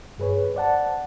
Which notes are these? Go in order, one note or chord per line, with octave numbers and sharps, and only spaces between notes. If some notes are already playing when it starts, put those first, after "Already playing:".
G2 G#4 B4 C#5
C5 D5 F#5 A5